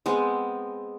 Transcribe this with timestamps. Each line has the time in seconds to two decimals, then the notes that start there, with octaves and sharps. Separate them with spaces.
0.06 G#3 B3 C4